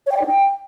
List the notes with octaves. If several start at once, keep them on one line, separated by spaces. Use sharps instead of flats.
C#5
G5
D5
D#4
G5